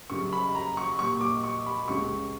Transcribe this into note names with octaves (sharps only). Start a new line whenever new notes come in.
F#2 C#3 G3 C#6
B5
A#5
C#6
A#2 G3 C#6
D6
C#6
B5
C#2 C#3 G3 C#6